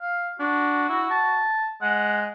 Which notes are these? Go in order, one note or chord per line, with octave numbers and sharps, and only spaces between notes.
F5
D4 F#4
E4
A5
G#3 F#5